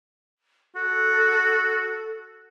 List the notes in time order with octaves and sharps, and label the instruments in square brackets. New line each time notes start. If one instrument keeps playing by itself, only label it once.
[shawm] F#4 [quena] A4